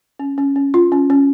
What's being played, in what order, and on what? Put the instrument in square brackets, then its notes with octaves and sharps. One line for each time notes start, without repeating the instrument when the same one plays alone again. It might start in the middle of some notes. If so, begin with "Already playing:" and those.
[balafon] C#4
C#4
C#4
F4
C#4
C#4